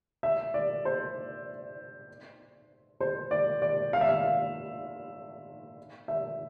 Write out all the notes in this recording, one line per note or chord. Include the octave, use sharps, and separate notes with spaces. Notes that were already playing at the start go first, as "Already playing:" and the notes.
E5
D5
C5
C5
D5
D5
F5
E5
F5
E5